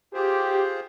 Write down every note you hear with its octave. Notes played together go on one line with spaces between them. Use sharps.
F4 G4 G#4 C5